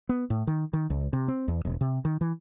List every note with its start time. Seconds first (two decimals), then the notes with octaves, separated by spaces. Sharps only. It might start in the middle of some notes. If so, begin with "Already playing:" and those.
0.09 B3
0.30 A2
0.47 D#3
0.73 D#3
0.90 C#2
1.13 C3
1.28 C4
1.48 E2
1.65 E1
1.81 C3
2.05 D#3
2.21 E3